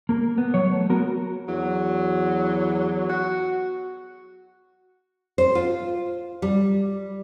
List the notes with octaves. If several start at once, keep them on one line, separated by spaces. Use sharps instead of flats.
A#3 A#4
B3
F#3 C#5
A3
B3 F#4 A#4
E2 F#3
F#4
C5
F4
G3